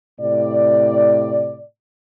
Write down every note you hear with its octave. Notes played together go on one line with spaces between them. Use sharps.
A2 C3 D5